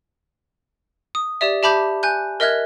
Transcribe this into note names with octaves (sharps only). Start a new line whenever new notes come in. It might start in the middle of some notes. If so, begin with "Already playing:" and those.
D#6
G4 D5 E5
G4 E5 A5 B5 D6 G6
G#5 F#6 G6
A#4 D#5 E5 F6 F#6 G#6